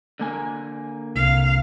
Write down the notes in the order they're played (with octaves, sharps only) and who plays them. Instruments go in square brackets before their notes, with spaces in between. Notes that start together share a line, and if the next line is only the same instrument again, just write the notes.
[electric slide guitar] D3 A#3 G#5
[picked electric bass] C2 [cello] F5